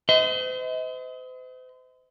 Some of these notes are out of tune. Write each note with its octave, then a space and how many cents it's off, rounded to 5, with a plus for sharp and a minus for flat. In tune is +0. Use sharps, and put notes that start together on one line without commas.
C5 -40 D#5 +35